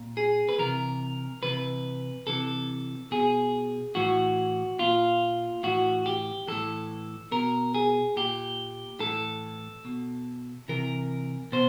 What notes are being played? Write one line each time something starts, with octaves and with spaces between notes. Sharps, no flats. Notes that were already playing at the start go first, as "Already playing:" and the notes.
Already playing: A#2
G#4
B4
C3 E3 A#4
C3 E3 B4
C3 E3 A4
B2 G#4
A2 E3 F#4
A#2 F4
A2 E3 F#4
G4
A2 E3 A4
B2 A#4
G#4
A#2 G4
A2 E3 A4
B2
C3 E3 A#4
B2 C5